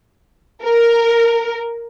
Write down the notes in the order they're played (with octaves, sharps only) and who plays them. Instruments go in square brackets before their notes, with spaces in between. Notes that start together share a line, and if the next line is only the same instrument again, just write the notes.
[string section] A#4